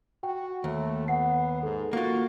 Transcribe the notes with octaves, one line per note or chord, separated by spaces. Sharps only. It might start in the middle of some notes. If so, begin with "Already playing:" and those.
F#4 G5
D#2 A3
B3 F#5 C7
G#2 A4
A#3 F4 F#4